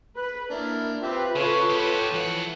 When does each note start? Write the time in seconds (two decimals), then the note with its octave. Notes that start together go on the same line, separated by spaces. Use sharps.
0.16 B4
0.50 A#3 D4 E4 A#4
1.03 C4 F4 G4 B4 E5
1.35 C#3 A4 C#5
1.69 B3 G4
2.14 E3 F3 F#5